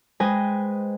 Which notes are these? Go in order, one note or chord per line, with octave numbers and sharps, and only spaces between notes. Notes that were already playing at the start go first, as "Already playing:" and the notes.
G#3 B4 C5 D#5 G5 G#5